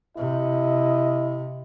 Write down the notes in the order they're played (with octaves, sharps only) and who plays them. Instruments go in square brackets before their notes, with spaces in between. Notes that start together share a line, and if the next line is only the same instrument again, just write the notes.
[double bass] C3 [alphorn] E4 [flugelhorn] D#5